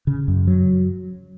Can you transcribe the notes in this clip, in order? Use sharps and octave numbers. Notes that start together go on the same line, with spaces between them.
C#3
F#2
F#3